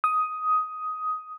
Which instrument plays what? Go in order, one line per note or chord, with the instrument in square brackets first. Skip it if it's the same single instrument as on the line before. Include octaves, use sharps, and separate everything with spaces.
[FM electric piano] D#6